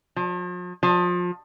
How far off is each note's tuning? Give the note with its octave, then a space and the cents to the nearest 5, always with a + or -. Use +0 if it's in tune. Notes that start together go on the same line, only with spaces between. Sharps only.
F3 +40
F3 +30